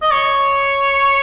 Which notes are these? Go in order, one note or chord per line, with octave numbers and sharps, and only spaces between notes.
D#5
C#5